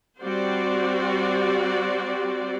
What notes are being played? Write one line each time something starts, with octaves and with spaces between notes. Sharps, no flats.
G3 C4 F#4 G4 C5 D5